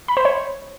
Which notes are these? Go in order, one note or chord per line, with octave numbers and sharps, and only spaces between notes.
B5
C5
C#5